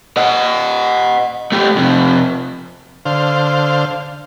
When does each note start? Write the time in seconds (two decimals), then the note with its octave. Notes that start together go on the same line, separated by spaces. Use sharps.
0.17 D#5 F#5
1.52 A3 G4
1.76 F2 C3
3.06 D3 C5 F5